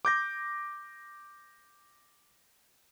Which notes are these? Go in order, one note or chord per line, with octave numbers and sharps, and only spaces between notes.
D6 G6 A#6